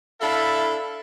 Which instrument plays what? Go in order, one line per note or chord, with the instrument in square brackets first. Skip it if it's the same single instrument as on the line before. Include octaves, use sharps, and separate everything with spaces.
[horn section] D4 E4 A4 [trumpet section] E5 F5 B5